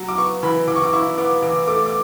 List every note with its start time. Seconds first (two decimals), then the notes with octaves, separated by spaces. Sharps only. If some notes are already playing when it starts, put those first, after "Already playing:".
Already playing: F#3
0.08 D6
0.18 B3 C#6
0.43 E3 B5
0.67 E3 D6
0.75 C#6
0.84 D6
0.93 E4 C#6
1.17 B3 D6
1.43 E3 D6
1.67 A3 D6
1.86 D6